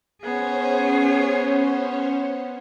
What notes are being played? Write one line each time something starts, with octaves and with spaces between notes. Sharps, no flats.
B3 C#4 G#4 C5 C#5